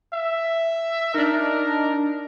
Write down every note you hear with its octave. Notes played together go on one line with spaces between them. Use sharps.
E5
D4 D#4 A#4